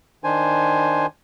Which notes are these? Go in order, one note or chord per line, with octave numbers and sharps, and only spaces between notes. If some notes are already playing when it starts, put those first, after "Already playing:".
D#3 D4 C5 G#5